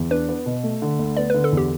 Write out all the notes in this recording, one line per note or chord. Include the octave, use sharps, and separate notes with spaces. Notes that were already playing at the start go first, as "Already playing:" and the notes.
Already playing: E2
D4 B4
B3
B2
A3
D3
D2
B3 D5
D3 B4
A4
E2 G4